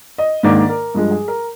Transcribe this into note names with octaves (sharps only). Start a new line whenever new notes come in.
D#5
G#2 D#3 A#3 D4 D5
A#4
G2 F3 G#3
G#4
A#4